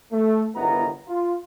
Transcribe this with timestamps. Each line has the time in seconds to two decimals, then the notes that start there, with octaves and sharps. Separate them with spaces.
0.12 A3
0.55 G1 C#2 D#3 B3 E4 A#5
1.08 F4